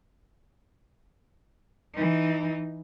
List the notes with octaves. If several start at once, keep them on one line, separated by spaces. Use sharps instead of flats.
E3 D#4